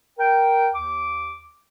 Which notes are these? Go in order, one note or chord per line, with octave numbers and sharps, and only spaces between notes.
A#4 G5
D#2 D6